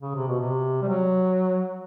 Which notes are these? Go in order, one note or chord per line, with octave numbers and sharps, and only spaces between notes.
C#3
C3
B2
C3
G3
F#3